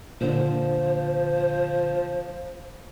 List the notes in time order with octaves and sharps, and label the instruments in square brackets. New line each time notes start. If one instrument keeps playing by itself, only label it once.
[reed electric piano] A#2 D3 [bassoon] F3 [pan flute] C5